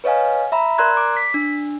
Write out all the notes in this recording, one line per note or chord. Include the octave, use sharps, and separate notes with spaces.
B4 C#5 D#5 F5 G#5
E5 A#5 B5
A#4 D5 A#5 C6 F#6 G#6
D6
B6
D4